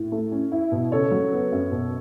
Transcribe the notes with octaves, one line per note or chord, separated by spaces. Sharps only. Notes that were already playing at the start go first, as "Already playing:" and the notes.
Already playing: A2
A3
C#4
E4
B2
C#3 A4 C#5
F#3
B3
F#2
B2